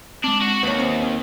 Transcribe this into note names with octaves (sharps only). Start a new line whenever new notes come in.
G#3 C4 D4
F#4
D#2 B4 C#5
C4 C5
C4 G7